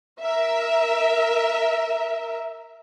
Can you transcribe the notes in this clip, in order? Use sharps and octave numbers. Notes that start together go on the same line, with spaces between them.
A#4 E5